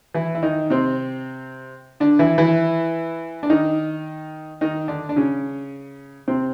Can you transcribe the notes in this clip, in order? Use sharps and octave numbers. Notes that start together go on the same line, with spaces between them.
E3 E4
E4
D#3 D#4
C3 C4
D3 D4
E3 E4
E3 E4
D4
D#3 D#4
D#3 D#4
D3 D4
D4
C#3 C#4
C3 C4